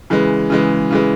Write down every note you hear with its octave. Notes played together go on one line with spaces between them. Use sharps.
C#3 E3 G#3
C#3 E3 G#3
C#3 E3 G#3